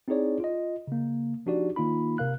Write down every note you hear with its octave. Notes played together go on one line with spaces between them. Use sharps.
C4 D#4 E4 G#4 C#5 D5
F4 D#5
C#3 A#3
F3 D4 D#4 F#4 G4 D5
D#3 A#3 D#4 F4 B5
C3 A#4 F5 F#6